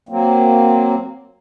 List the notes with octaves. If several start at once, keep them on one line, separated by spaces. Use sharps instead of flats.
F#3 A#3 C4